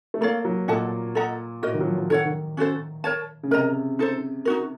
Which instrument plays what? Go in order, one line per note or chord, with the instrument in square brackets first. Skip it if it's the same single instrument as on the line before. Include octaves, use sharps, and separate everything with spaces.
[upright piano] A3
[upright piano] A#3 [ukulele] A4 C#5 F5
[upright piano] F#3
[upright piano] A#2 [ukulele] A4 D#5 F#5 A5
[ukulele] A4 D#5 F#5 A#5
[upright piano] A2 [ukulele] F#4 A#4 D#5
[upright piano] D#3
F#3
F3
F#3
[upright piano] D#3 [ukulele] A4 C#5 F#5
[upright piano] D#3
[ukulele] C#4 F#4 A4 C5
A#4 C#5 A5
[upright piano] C#3
[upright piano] C3 [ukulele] A#4 D#5 A#5
[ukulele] D#4 A4 C5
D#4 F#4 A#4